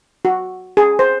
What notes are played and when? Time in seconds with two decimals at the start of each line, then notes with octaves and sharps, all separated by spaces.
0.25 F#4
0.77 G#4
0.99 C5